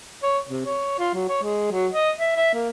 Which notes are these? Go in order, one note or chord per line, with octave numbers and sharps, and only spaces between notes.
C#5
C3
C#5
F4
F#3
C#5
G#3
F#3
D#5
E5
E5
A#3